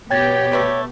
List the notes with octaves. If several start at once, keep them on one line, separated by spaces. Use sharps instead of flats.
B2 B3 G4 C#5 G5 G#6 A6
A3 B4 D5